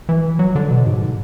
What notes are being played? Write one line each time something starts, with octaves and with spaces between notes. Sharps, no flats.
E3
F#3
D3
B2
G#2